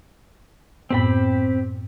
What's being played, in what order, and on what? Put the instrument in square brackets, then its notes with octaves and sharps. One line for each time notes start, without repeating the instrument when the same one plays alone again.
[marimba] F#2 A2 B3 [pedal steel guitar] C4 G4 B5